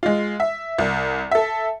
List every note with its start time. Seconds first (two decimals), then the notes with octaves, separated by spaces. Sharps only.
0.03 G#3 F4
0.40 E5
0.79 C2
1.31 A4 E5